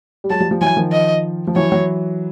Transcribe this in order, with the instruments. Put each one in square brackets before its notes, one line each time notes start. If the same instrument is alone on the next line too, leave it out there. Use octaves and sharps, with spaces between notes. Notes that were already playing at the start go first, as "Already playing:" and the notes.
[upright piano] G3
[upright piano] F#3 G#3 [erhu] A5
[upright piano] F3 G3
F3 G3
[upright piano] E3 F#3 [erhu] G#5
[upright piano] D#3 F3
[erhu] D#5
[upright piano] F3
[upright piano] E3 F#3 [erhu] C#5
[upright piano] E3 F#3